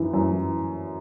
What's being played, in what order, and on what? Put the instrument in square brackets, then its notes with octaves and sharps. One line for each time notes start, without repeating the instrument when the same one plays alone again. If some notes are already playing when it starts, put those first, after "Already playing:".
Already playing: [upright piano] F#2 E3
F#2
E3